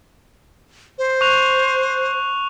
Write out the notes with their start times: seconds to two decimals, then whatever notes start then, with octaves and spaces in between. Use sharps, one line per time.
0.98 C5
1.21 C#6 F#6 F7